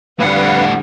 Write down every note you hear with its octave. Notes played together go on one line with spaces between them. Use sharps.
F2 A2 D3 G3 B4 F5 F#5